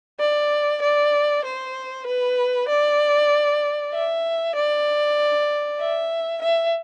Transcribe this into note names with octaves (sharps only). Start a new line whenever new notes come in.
D5
D5
C5
B4
D5
E5
D5
E5
E5